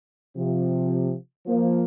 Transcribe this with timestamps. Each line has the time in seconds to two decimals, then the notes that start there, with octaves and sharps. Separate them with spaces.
0.36 C3 F3
1.46 F3 A#3